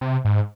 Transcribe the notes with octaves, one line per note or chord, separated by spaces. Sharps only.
C3
G#2